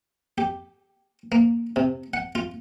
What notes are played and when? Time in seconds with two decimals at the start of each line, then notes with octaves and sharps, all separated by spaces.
0.38 G4
1.32 A#3
1.76 C3
2.14 F#5
2.35 F4